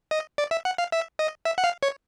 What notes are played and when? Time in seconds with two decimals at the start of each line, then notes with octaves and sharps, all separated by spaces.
0.11 D#5
0.38 D5
0.51 E5
0.65 F#5
0.78 F5
0.92 E5
1.19 D#5
1.45 E5
1.58 F#5
1.64 F5
1.83 C#5